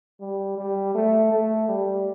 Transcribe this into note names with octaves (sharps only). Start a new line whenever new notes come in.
G3
G3
A3
A3
G3